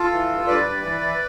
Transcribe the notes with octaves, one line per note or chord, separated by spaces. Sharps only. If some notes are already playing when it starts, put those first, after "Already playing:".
Already playing: F4 A4
E3
G2
G2 B4 D5
G2
E3
E3